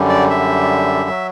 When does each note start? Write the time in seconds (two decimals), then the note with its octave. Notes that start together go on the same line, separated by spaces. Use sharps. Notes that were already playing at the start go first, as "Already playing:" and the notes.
Already playing: F#2 D3 G3
0.10 D5
0.30 E5
1.09 F#3